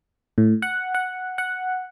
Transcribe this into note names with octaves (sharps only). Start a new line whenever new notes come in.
A2
F#5
F#5
F#5